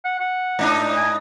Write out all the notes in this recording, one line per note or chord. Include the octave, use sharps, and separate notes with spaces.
F#5
F#5
G#2 D4 D#4
G#5